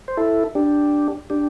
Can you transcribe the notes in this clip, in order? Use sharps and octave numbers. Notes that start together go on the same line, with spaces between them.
C5
E4 A4
D4 G4
D4 G4